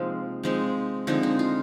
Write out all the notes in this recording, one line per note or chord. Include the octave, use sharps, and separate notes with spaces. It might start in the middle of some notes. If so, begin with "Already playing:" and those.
Already playing: C3 F3 G#3 A#3 C4 D#4 F4
F3 G#3 C4 D#4
D3 F3 G#3 C4 D#4
D#4
F4